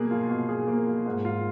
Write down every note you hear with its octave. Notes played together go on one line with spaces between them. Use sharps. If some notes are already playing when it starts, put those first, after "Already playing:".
Already playing: B2 A#3 G#4
F4
B2
G#4
A#3
F4
G#2
F4